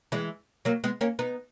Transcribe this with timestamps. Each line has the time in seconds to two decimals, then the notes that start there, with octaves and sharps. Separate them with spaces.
0.12 E3 G#3
0.65 F#3 A#3
0.84 G#3 B3
1.01 A#3 C#4
1.19 B3 D#4